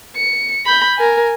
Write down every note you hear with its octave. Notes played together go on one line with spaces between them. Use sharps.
C#7
B5 G6
A#4 G#5